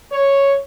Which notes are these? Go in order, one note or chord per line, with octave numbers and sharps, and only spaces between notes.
C#5